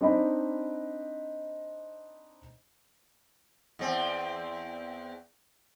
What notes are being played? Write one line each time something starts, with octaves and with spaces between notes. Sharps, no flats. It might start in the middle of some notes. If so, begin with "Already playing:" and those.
C4 D4 D#4 C5 D#5 B5
E2 C4